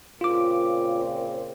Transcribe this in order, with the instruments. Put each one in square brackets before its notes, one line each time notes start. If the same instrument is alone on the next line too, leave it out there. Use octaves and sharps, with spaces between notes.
[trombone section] A#2 C#3 C4 [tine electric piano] F4 D6